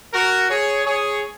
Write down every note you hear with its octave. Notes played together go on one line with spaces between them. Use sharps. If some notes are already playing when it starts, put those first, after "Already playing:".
F#4 A#4
G#4 C#5
G#4 C#5